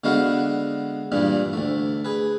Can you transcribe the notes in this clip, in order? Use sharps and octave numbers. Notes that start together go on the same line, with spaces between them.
D3 G#3 B3 F#4 F5 F#5
G2 A#2 E3 G3
D2 A3
G#4 B4